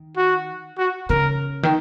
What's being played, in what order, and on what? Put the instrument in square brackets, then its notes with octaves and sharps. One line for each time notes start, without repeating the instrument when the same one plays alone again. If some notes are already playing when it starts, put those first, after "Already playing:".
Already playing: [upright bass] D#3
[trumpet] F#4
F#4
[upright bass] C#3 [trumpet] A#4
[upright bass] D#3